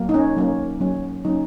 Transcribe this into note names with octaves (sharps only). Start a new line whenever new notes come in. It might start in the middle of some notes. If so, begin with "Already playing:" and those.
Already playing: F#3 A#3
D#4
C#4
F#3 A#3 C#4
F#3 A#3 C#4
F#3 A#3 C#4 D#4